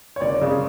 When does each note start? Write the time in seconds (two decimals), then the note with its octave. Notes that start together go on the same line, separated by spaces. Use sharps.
0.16 C#5
0.21 F#1 D5
0.41 C#3